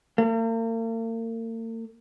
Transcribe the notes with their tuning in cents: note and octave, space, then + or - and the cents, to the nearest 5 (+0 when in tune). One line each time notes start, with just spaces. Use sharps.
A#3 -45